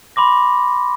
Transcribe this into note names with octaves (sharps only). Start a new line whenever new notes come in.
B5 C6 D6 A#6